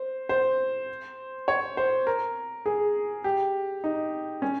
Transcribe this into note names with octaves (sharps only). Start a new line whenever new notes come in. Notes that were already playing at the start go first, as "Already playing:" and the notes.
Already playing: C5
C5
C#5
C5
A#4
G#4
G4
D#4
C#4